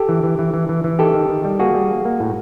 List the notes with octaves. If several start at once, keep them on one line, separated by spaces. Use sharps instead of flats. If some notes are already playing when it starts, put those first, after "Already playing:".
Already playing: G4 A4
E3
E3
E3
E3
E3
E3
D#3 G4 A4
D#3
D#3
G3
A#3 F#4 G#4
G3
A#3
A#3
A2